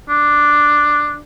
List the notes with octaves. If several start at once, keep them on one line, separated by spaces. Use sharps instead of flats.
D4